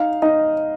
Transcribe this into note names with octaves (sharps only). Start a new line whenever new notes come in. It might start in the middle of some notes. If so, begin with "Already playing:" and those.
Already playing: D#4 F5
D#4 D#5